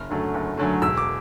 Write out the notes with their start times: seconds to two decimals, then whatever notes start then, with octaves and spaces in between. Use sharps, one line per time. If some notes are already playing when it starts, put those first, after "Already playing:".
Already playing: F#1 F6
0.10 F#2 D3 F#3 A3
0.34 F#1
0.57 F#2 D3 F#3 A3
0.82 E1 E6
0.97 D6